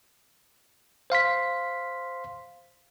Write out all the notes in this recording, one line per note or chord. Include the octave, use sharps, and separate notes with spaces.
C5 F5 C6 B6